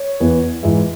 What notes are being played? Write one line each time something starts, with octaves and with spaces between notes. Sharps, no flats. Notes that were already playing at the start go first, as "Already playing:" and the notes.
Already playing: C#5
E2 E3 B3
G#2 E3 G#3 E5